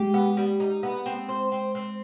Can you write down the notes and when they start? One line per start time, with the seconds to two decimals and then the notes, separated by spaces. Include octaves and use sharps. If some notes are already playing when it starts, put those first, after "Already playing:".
Already playing: G#3 G4
0.14 B3
0.37 G3
0.60 D#4
0.83 B3
1.06 C4
1.29 C5
1.52 C4
1.75 C4